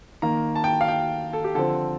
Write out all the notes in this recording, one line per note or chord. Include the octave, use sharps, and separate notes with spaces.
D#3 A#3 A#5
A5
G5
F5
G5
A4
G4
D3 F3 C4 A4